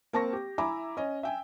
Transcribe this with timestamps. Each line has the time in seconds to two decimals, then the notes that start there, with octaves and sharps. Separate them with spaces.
0.13 A#3 C4 A5 C#6 A#6
0.33 G4
0.58 E4 E5 G#5 A#5 B5 D6
0.97 C#4 D#5
1.23 E5 G5 G#5